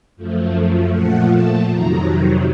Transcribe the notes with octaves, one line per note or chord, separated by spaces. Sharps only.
F#2 F3 A3
A#2 F3 A3 F#5
A5
F2 C3 D#3 F#3 A#5